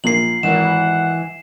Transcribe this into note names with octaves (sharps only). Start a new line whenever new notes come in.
A#1 A#2 A#3 C7 F#7
G#1 E3 A#4 F#5 E7